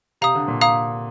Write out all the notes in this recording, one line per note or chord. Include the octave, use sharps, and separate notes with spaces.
C3 F5 A#5 D#6
D3
A#2
F5 A#5 D#6